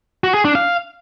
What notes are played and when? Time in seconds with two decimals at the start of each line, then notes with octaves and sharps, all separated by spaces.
0.24 F#4
0.34 G#4
0.45 D4
0.55 F5